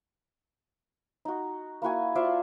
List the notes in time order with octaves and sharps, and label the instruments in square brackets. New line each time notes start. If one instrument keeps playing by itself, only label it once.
[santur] D#4 F#4
A#3 E4 F#4 G#5
F4 C5 D5 E5